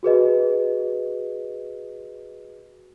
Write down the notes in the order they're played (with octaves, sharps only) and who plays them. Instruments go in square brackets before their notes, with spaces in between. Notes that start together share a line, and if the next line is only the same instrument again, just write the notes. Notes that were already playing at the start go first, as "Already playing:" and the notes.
[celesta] F#4 G#4 B4 D#5